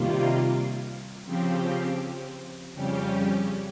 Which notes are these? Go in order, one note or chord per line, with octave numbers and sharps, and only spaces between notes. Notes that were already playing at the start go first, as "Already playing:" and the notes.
Already playing: C3 D#3 G3 A#3 F4
C#3 F3 C4 G4
F2 C#3 G3 C#4 G4